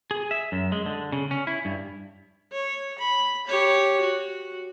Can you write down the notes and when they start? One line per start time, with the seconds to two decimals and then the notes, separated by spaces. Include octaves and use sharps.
0.11 G#4
0.31 E5
0.52 F#2
0.72 G#3
0.86 D3
1.12 C#3
1.31 C#4
1.47 E4
1.65 G2
2.52 C#5
2.99 B5
3.47 G4 C#5
4.01 F#4